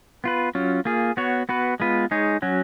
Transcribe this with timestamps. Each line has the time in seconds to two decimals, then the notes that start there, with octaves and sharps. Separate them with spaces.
0.24 B3 F4 B4
0.55 F#3 C#4 F4
0.85 A#3 F4 G#4
1.17 B3 F#4 C#5
1.49 B3 F#4 B4
1.80 G#3 B3 F4 B4
2.11 G#3 D#4 G#4 C#5
2.42 F#3 C#4 F#4